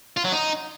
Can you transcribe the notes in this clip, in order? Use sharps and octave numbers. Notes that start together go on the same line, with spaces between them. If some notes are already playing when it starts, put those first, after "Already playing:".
F4
F#3
D#4